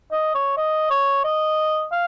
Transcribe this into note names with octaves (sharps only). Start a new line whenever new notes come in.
D#5
C#5
D#5
C#5
D#5
F5